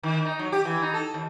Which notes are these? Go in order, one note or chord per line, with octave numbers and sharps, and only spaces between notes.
D#3
D#4
F#3
G4
E3
D#4
A4
D#2